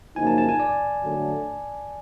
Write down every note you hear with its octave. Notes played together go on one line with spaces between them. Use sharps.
F#2 C#3 F3 A#3 D#4 G#5
A5
A5
G#5
D5
D3 F#3 A3 D4